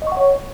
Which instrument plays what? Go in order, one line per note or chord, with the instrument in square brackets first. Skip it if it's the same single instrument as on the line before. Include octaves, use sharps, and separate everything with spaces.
[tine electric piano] D#5
C#6
F#5
C#5